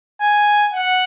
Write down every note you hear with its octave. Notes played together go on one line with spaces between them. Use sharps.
G#5
F#5